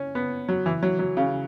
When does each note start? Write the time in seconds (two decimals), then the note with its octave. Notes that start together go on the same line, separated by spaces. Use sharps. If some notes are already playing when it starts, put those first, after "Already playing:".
Already playing: C#4
0.15 B3
0.49 F#3
0.66 E3
0.83 F#3
0.99 F#3
1.17 C#3